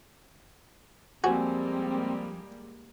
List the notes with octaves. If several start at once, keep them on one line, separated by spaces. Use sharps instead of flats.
F2 G3 G#3 A#3 C4 F#4 C5 G#5